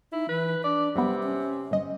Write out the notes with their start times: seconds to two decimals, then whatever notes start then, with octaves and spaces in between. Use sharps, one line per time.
0.12 D#4 E4
0.29 E3 B4
0.64 D4 D5
0.95 F#2 C3 G3 B3
1.23 C#4
1.71 G1 D#5